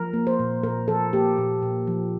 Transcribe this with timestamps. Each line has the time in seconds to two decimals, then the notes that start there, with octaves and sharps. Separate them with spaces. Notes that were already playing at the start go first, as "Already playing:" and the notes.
Already playing: F3 A#4
0.13 A#3
0.27 C5
0.39 A#2
0.63 A#2 A#4
0.88 F3 A4
1.13 A#3 G4
1.38 A#2
1.62 A#2
1.87 F3